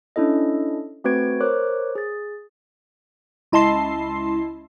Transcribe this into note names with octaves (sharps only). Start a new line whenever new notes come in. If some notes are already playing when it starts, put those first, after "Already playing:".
C#4 D4 E4 A4 D#5
A3 C4 F#4 B4 G#6 D7
A#4 C5 C#5 D6 F#6
G#4 A6
C#2 E4 D#5 A5 C6 C7